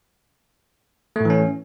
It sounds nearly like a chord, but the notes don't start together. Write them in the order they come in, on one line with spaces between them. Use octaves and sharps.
A3 A2 E3 C#4